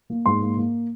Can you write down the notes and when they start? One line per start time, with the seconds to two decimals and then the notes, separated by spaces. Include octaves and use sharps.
0.10 A#3
0.26 G#2 C6
0.41 A#3
0.57 A#3